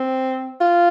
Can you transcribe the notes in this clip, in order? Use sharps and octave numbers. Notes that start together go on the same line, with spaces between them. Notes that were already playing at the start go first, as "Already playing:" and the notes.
Already playing: C4
F4